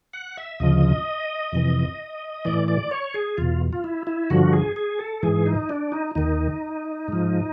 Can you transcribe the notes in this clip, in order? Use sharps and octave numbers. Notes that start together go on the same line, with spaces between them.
F#5
E5
D2 C#3 F3 D#5
F2 C3 E3
A2 E3 D5
D5
C#5
G#4
E2 B2 F4
F4
E4
E4
G2 D3 F3 F#4
G#4
G#4
A4
G#2 E3 G#4
D#4
D4
D#4
D#2 D#3 D#4
G#2 F3